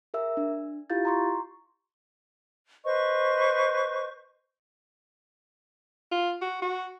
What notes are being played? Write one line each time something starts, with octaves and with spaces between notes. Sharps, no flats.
G#4 A#4 E5 E6
D4
E4 F4 G4 F5 G6 A6
A#5 C6 C#6
B4 C5 D#5 C#6
F4
F#4
F#4